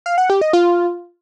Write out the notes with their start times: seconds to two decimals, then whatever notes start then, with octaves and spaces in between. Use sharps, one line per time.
0.06 F5
0.18 F#5
0.30 G4
0.41 D#5
0.53 F4